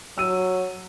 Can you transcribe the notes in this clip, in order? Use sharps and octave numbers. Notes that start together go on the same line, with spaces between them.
F#3 E6 D#7